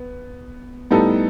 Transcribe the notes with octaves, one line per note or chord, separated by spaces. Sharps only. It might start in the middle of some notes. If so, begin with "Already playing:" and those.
Already playing: B3
A2 G3 B3 D#4 A4